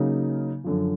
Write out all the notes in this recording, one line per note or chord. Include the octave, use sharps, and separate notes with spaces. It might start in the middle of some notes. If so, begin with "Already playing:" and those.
Already playing: C#3 F#3 A#3 D#4
F#2 D3 F3